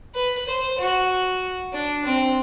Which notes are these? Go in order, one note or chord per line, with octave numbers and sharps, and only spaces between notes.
B4
C5
F#4
D4
C4